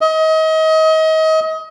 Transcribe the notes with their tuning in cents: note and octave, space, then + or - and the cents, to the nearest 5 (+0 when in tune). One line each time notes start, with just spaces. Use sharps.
D#5 +30